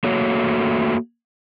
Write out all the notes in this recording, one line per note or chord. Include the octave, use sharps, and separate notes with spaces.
A3 A#3 F#4 C#5